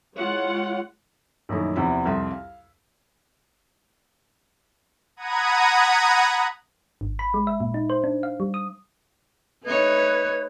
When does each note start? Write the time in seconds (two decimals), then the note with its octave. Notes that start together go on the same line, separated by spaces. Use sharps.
0.17 G#3 E4 F4 C#5 F#5
1.49 A#1 F#2 D#3 A3 E4
1.76 E2 C3 F3 E4 E6 B6
2.05 C2 F2 E5 C6
2.31 F5
5.16 F#5 A#5 B5 D#6 G#6 D#7
7.01 G#1
7.19 B5
7.34 G#3
7.47 E5
7.60 A#2
7.74 D#4
7.90 C5
8.04 D4
8.23 F5
8.40 G3
8.54 D#6
9.64 A3 D#4 B4 C#5 G#6